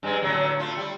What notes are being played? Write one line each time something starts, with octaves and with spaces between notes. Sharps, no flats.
G2 G#3
A2 D3 F#3
A3 F4
G3